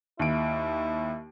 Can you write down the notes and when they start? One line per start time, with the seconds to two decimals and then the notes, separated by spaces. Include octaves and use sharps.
0.19 D#2 E4 D7